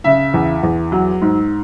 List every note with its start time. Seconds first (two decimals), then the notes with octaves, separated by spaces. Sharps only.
0.04 C#3 E5
0.34 E2
0.63 E2
0.92 F#3
1.21 G#2